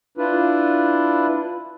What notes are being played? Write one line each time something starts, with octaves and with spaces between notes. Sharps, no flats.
D4 E4 F4 B4